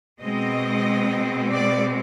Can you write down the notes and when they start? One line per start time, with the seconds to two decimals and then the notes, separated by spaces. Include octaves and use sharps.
0.22 B2 G#3 C4 D#5
1.50 D5